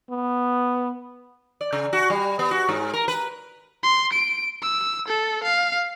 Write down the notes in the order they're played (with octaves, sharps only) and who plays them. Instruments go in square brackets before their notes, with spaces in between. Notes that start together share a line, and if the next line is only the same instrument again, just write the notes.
[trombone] B3
[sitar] D5
C#3
F#4
G3
B3
F#4
G#2
A#4
B4
[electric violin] C6
D7
E6
A4
F5